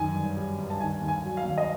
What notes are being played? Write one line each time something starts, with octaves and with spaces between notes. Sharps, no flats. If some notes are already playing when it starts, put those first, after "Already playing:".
Already playing: F#2 D#3 G#5
G2
G3
G2
A5
D#3 G#5
D#2
G#5
F#3
F5
D#2
D#5